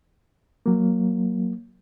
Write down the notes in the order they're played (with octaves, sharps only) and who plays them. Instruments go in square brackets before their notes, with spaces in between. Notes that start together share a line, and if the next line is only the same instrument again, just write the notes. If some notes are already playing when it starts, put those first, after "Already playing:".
[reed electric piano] F#3 A#3